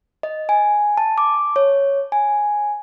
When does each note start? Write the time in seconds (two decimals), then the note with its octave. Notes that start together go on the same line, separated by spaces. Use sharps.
0.23 D#5
0.49 G#5
0.97 A5
1.18 D6
1.56 C#5
2.12 G#5